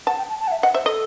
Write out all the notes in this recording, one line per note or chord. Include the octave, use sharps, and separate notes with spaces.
F#5 A5
G5
A5
A5
F#5
E5
D#5 F#5
C5 E5
A4 D#5